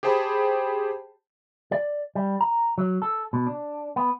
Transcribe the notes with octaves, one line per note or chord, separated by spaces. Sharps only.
G4 G#4 C5 G5 A5 B5
D5
G3
A#5
F#3
A4
B2
D4
B3